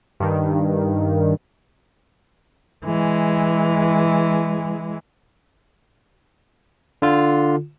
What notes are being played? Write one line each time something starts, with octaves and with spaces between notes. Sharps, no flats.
G2 D#3
E3 G#3
D3 F4